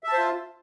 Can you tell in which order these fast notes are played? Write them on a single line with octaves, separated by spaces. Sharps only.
E5 A5 C5 F4